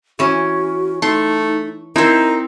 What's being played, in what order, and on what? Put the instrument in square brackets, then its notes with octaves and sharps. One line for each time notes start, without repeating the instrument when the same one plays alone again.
[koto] E3 C#4 [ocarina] F#4
[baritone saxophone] A3 [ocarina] D#4 [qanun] C6
[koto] C4 [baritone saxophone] D#4 [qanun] E4 C5 [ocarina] A#4